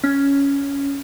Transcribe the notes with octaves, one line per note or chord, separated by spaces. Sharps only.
C#4